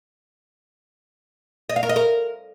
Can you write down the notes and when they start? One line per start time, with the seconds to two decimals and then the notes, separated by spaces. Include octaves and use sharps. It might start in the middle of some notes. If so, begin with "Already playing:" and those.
1.69 D#5
1.76 F5
1.83 A#4
1.89 D#5
1.96 A#4